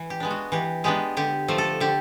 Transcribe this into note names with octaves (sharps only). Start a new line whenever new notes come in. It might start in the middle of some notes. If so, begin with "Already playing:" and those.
Already playing: E3
G4
G#3 B3 D4
F#4
E3 G4
G#3 B3 D4 G4
D3 G4
F3 A3
A4
D3 G4